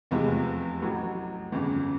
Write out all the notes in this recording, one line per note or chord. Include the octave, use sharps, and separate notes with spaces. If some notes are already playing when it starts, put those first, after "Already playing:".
F1 E2 C3 F3 G#3
A1 A2 F#3
G1 F2 C#3